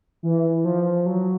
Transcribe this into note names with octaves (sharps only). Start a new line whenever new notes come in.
E3
F3
F#3